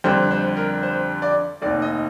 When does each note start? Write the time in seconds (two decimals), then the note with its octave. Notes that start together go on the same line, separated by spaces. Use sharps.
0.04 F2 D3 G3 C5
0.31 C5
0.57 A#4
0.83 C5
1.22 D5
1.62 F1 D#2 D#3 D5
1.82 D#5